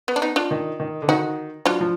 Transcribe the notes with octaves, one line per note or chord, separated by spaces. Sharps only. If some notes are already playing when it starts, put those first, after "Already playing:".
B3
D4
B3 D#4
D4 F4
D#3
D#3
D3
D#3 D#4 F#4
F#3 D4 F4
F3